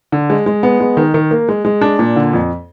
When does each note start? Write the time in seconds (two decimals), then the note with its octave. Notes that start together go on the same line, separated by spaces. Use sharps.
0.12 D3
0.30 G#3
0.46 G#3
0.63 B3
0.80 G#3
0.97 D#3
1.14 D#3
1.31 A#3
1.49 G#3
1.65 G#3
1.81 D4
1.99 A#2
2.16 D3
2.33 F2